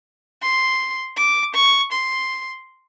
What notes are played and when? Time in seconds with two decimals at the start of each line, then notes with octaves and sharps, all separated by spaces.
0.42 C6
1.17 D6
1.55 C#6
1.92 C6